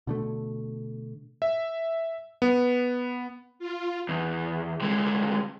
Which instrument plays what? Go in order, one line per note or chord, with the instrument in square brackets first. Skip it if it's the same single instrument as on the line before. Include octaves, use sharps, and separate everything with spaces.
[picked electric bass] B2 D3 A3
[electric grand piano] E5
B3
[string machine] F4
[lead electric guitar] E2
D2 G#3